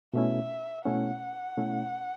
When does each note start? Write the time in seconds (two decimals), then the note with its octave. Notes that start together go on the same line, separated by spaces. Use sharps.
0.14 B2 A3 C#4 E4 E5
0.86 B2 A3 C#4 E4 F#5
1.58 B2 A3 C#4 E4